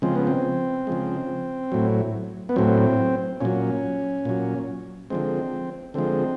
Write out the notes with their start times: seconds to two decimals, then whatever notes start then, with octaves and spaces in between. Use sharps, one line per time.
0.02 C#3 F3 G#3 C4
0.15 B3
0.27 C4
0.87 C#3 F3 G#3
1.72 A2 F#3
2.49 B3
2.56 A2 F#3 C4
3.41 A#2 F#3 C#4
4.25 A#2 F#3
5.10 D3 F3 G#3 C4
5.94 D3 F3 G#3 C4